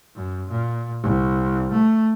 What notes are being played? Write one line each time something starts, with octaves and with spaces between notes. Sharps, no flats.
F#2
A#2
C2
A3